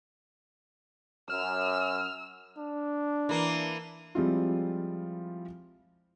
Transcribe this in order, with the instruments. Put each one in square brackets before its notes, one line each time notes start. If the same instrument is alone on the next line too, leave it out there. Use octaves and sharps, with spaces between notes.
[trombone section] F#2 [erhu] E6 [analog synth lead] F6
[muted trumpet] D4
[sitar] E3 A#3
[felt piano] F3 G3 G#3 C4 E4 F4